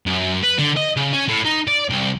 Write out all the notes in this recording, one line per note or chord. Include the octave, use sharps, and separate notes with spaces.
F#2
B4
D3
D#5
C#3
C#4
A2
D#4
D5
C2